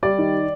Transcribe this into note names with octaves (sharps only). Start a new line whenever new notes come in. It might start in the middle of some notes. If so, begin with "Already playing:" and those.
G3 D5
D#3